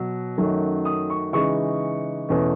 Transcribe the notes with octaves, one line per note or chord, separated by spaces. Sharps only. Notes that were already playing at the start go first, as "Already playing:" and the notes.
Already playing: B2 F#3
F#2 D#3 F#3 A3 C#4
D#6
C#6
C#3 E3 G#3 D#4 C#6
E2 B2 A3 C#4